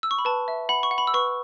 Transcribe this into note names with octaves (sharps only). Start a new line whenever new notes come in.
E6
C#6
B5
B4 A5
E5
F#5 B5
C#6
F#5
B5
E6
B4 C#6